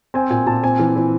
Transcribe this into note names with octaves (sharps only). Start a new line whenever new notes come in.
C4 G#5
A#2 G#5
A#2 A5
C4 G#5
E3
E3